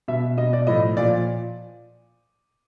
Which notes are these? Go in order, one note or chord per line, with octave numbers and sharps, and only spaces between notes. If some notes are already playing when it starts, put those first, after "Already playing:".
B2 E5
B2 D#5
D5
A2 F3 D#5
A#2 F3 D5